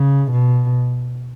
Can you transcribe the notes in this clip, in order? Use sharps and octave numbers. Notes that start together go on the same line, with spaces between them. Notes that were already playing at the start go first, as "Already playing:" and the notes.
Already playing: C#3
B2